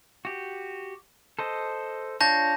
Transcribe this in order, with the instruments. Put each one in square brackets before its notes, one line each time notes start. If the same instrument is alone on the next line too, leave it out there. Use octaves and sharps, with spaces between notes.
[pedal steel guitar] F#4 G4
A4 C5 D#5
[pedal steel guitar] D4 F4 C#5 [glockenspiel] A5 G6 A#6